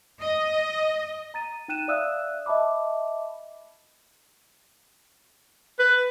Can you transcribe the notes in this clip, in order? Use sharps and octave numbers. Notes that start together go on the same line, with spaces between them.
D#5
A#5 A6 D#7
D#4 G5 F#6 D#7 E7
D5 E5 F5 D#6 E6 F#6
D#5 E5 A5 B5 D6
B4